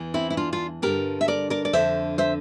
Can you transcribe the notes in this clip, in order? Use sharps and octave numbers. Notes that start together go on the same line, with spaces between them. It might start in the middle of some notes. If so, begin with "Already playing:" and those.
Already playing: E2 E3
C4 E4
E4
D4 F4
D4 F4
G2 D3 G4 A#4
E5
A#4 D5
A#4 D5
D5
F2 D3 C5 E5
C5 E5